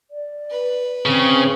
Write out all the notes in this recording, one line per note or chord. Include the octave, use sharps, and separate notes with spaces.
D5
B4
C#3 C4